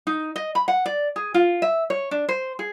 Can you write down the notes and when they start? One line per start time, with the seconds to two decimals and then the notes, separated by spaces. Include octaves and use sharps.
0.07 D#4
0.36 D#5
0.55 B5
0.68 F#5
0.86 D5
1.16 G#4
1.34 F4
1.62 E5
1.90 C#5
2.11 D4
2.29 C5
2.59 G#4